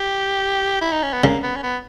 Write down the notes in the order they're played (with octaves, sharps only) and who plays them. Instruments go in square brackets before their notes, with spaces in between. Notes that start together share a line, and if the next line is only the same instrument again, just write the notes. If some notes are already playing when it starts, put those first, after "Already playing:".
Already playing: [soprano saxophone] G4
E4
D#4
C#4
B3
[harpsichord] C#3 [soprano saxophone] A#3
[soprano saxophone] B3
C#4
B3